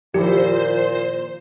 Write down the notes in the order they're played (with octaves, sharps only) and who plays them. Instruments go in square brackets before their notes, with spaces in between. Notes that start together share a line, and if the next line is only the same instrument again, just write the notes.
[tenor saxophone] A#2 [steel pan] D#3 F3 E4 [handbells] G4 [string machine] C5